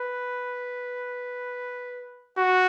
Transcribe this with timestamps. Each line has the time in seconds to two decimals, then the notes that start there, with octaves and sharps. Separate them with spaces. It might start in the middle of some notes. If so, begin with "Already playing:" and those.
Already playing: B4
2.38 F#4